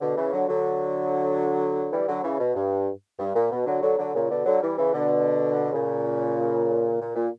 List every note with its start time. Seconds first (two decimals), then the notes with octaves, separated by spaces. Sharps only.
0.02 B2 D3
0.17 C#3 E3
0.33 D3 F#3
0.49 D3 F#3
1.92 E3 G3
2.08 D3 F#3
2.24 C#3 E3
2.40 B2
2.55 G2
3.19 G2
3.35 A#2
3.52 B2
3.66 D3 F#3
3.83 D3 F#3
3.99 D3 F#3
4.14 A#2 C#3
4.31 B2 D3
4.46 D3 F#3
4.62 E3 G3
4.78 C#3 E3
4.94 B2 D3
5.73 A#2 C#3
7.01 A#2
7.16 A#2